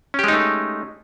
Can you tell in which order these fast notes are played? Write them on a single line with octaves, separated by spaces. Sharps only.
C#4 G4 G#3 D#4 A3